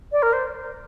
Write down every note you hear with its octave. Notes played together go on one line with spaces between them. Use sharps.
D5
A#4
C5